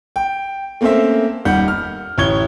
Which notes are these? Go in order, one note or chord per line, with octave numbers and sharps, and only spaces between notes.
G5
A3 A#3 C4 C#4 C5 E5
D#1 D#3 G3 F#5 G6
F6
A1 E4 C#5 G#6 G7